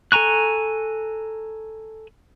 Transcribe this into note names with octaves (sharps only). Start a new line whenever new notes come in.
A4 G#5 A#5 C#6 F#6